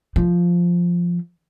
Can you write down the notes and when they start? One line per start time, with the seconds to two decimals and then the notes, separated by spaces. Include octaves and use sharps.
0.16 F3